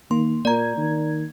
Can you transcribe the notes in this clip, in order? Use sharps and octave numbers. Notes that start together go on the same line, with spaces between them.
D#3 A#3 C6
A#2 A#3 D5 A#5 G#6
D#3